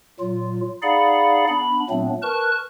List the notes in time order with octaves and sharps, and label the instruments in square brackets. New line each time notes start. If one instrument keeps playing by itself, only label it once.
[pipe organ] A#2 F#3 F4
D#4 G#4 D5 F5 F#5 B5
B3 D4 B5
A#2 F#3 A3 B3 C4 D4
A#4 B4 A5 C#6 F#6